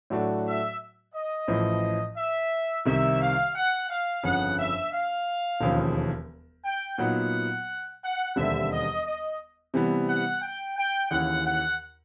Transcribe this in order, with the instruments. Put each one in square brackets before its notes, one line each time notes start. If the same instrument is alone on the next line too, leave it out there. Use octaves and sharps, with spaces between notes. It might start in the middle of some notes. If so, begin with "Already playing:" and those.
[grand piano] A2 F#3 A3 D4 F#4
[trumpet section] E5
D#5
[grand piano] A1 A2 F3
[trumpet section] E5
[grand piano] C2 C3 D#3 [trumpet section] E5
[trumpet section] F5
F#5
F5
[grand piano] G1 F2 C#3 F3 [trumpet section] F#5
[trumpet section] E5
F5
[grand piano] E1 D#2 C#3 F3
[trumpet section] G5
[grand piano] A#2 F#3 B3 D#4 [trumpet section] F#5
[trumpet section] F#5
[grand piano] E1 D#2 D3 G3 C4 [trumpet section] E5
[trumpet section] D#5
D#5
[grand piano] C3 E3 G3 B3
[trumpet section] F#5
G5
G5
[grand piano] D#2 C#3 E3 [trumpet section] F#5
[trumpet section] F#5